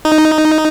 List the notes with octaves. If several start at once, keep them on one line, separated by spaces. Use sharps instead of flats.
D#4